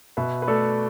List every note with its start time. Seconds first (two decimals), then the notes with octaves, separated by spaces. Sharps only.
0.17 B2 B4 E5
0.42 B4
0.47 A3 A4 D5